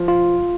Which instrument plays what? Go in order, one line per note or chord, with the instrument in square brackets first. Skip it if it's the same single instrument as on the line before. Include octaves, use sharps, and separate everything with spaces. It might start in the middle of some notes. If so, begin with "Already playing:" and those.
Already playing: [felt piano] F3
[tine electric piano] F4